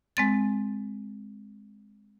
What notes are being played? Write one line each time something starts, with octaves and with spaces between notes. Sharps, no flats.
G#3 C4 A6